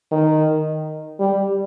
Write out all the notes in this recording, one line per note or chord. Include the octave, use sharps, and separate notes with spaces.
D#3
G3